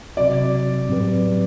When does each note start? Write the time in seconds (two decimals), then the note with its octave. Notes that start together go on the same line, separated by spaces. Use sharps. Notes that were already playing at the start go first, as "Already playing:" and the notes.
0.17 C3 F#3 C4 F#4 D5
0.89 A2 F#3 C4 G4 B4